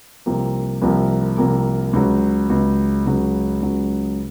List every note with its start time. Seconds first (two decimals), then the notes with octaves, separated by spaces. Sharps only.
0.26 C2 C3 F3 A#3
0.82 C2 C3 F3 A#3
1.38 C2 C3 F3 A#3
1.93 C#2 C#3 F#3
2.50 C#2 C#3 F#3
3.06 C#2 C#3 F#3
3.62 C#2 C#3 F#3